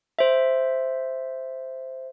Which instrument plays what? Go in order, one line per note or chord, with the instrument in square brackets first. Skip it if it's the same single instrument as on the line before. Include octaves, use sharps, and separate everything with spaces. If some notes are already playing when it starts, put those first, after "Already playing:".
[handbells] C5 E5